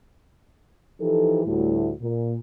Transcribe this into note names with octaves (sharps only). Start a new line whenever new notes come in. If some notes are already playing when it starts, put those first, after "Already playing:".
E3 F3 D#4 G4 A4
D2 A2 G3 A3 E4 F#4
A#2